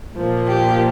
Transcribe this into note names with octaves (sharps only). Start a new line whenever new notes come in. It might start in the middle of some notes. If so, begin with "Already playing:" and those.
A#2 F3 A#3
G4